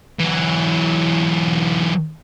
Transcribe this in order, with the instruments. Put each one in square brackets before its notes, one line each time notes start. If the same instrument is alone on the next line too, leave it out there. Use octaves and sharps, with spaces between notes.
[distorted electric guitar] E3 F#3